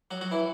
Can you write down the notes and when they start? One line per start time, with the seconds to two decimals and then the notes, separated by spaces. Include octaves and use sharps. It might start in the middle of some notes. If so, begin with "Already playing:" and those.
0.11 F#3 F#4
0.21 F#3 F#4
0.31 E3 E4